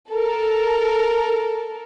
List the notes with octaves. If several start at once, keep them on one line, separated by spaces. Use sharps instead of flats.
A4 A#4